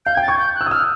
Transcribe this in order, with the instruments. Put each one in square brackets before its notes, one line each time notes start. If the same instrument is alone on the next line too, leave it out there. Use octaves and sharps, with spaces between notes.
[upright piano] F5 [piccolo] G6
[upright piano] G5 [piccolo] G#6
[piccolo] A6
[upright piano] C#6 [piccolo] G#6
[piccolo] G6
F#6
[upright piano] E6
D#6
[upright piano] E6 [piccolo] F6